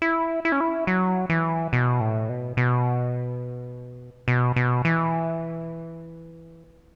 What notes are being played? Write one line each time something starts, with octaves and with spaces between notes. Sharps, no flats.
E4
E4
C#4
E4
F#3
E3
B2
A2
B2
B2
B2
B2
E3